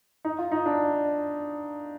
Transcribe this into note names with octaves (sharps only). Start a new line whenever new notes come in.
D#4
F4
D#4
D4